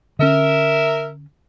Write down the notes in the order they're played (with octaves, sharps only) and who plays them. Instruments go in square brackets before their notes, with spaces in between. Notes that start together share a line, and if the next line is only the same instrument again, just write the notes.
[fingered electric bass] D3 C#4 [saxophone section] A#4 E5